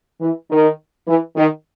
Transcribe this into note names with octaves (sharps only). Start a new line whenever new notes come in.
E3
D#3
E3
D#3